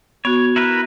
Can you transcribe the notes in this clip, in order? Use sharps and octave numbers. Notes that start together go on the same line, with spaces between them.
B3 F#4 C#5
E4 A#4 B4